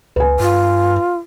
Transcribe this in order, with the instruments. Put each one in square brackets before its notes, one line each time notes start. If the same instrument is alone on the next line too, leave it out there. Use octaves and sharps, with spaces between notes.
[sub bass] C#2 [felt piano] B4 G#5
[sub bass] G2 [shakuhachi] F4